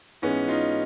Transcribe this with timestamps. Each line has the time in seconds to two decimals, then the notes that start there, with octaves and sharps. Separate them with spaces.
0.22 G#2 E3 G#3 B3 C#4
0.48 D#4 F4